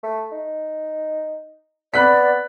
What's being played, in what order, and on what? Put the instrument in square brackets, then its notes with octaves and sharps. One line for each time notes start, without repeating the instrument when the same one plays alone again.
[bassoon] A3
D#4
[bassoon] B3 [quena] D5 [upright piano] B5 F#6 B6